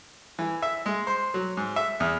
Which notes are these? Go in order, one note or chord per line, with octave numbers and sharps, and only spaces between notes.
E3
E5
G#3
C5
F#3
G#2
E5
E2